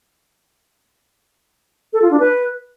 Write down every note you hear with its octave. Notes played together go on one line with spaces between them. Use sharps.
A4
F4
D4
B4